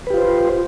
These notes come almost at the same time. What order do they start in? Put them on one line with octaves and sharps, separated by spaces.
B4 G4 F4 C5